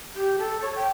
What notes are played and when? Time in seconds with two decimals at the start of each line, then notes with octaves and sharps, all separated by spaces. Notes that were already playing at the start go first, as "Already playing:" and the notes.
0.16 G4
0.39 A4
0.62 C#5
0.76 G5